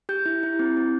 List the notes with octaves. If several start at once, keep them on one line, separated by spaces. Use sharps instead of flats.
G4 G6
E4
E4
C4
C4